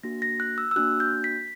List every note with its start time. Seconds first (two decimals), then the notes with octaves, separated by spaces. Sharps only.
0.03 A#3 D4 F#4 A#6
0.22 A#6
0.40 F#6
0.58 E6
0.71 E6
0.76 A#3 D4 F#4 F#6
1.00 G6
1.24 B6